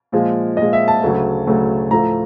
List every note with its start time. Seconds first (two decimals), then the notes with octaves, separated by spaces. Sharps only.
0.12 A#2 F3 G#3
0.57 A#2 F3 G#3 D#5
0.73 E5
0.88 A5
1.03 D2 C#3 F#3 A3
1.47 D2 C#3 F#3 A3
1.91 A2 F3 A3 A#5